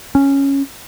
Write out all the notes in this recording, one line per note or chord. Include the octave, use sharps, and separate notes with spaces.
C#4